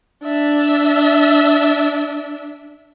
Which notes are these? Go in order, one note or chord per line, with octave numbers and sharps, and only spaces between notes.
D4 E5